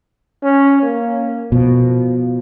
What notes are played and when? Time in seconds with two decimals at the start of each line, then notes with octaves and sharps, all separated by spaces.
0.43 C#4
0.82 A#3
1.52 B2 F3